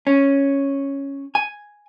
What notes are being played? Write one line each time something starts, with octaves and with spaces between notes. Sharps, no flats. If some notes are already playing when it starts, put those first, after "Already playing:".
C#4
G#5